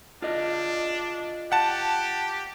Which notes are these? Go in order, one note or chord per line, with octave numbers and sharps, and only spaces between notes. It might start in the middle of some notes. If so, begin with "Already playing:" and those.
D4 F4 G#4 D#5
G4 F#5 A5